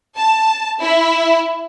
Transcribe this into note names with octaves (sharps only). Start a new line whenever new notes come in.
A5
E4